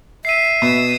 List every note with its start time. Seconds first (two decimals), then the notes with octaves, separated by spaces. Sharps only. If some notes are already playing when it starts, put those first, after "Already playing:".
0.25 E5 C7 D#7
0.62 B2 D#6 E6